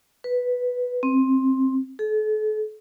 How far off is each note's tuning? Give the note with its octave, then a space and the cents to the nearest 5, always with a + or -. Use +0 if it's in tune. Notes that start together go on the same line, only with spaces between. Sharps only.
B4 +0
C4 +15
A4 -40